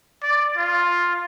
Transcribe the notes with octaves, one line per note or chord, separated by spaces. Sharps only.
D5
F4